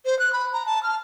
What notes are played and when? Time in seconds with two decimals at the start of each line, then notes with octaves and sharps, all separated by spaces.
0.05 C5
0.19 F#6
0.33 B5
0.53 A#5
0.66 A5
0.83 F6